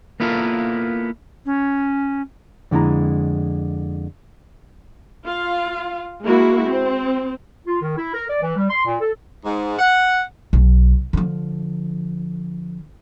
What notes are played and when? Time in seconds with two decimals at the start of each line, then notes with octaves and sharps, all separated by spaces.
0.20 A#3 B3 E4 F4 A4 A#4
1.45 C#4
2.71 F2 D3 G#3 E4 A#5
5.27 F4 F5
6.24 G#3 A#3 E4 F#4
6.67 C4
7.66 F4
7.82 D#3
7.97 E4
8.14 A#4
8.29 D5
8.41 E3
8.56 G3
8.70 C6
8.86 A#2
9.00 A4
9.45 G#2
9.79 F#5
10.53 B1
11.13 D3 F3